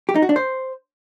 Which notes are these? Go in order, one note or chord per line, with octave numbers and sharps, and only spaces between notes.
G4
D#4
F#4
D4
C5